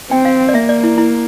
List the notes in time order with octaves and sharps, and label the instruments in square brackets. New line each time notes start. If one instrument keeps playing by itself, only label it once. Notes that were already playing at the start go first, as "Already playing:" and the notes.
[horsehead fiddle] C4 [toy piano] G5
[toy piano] F5
D5
[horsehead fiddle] A#3 [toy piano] E5
[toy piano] D5
E4
E4